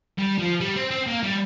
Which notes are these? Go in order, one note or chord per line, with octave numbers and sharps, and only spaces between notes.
G3
F3
G3
C4
C4
A#3
G3